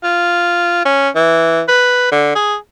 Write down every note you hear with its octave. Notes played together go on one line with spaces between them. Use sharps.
F4
C#4
E3
B4
D3
G#4